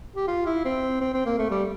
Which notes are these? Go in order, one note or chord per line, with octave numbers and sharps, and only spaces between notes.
G4
F4
E4
C4
C4
C4
A#3
A3
G3